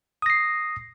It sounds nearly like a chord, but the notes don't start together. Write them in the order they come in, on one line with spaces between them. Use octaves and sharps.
D#6 A#6 C7